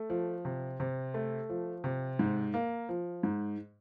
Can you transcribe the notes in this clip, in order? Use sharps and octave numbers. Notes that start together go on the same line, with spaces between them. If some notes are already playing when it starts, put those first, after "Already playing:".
Already playing: A3
F3
C3
C3
A3
F3
C3
G#2
A#3
F3
G#2